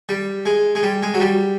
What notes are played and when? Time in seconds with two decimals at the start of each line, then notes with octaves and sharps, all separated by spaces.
0.09 G3
0.46 G#3
0.75 G#3
0.83 G3
1.03 G#3
1.14 F#3
1.20 G3